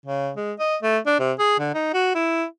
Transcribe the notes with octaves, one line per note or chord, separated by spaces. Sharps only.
C#3
G#3
D#5
A3
D4
C3
G#4
D3
D#4
F#4
E4